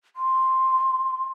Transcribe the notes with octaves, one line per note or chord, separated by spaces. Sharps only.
C6